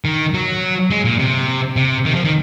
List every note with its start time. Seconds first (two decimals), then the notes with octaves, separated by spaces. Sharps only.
0.05 D#3
0.34 F#3
0.91 G#3
1.05 A#2
1.19 C3
1.76 C3
2.05 D#3
2.15 F3
2.24 D#3